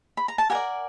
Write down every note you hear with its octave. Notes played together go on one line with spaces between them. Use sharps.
B5
A#5
A5
G4 A#4 D5 F#5 G#5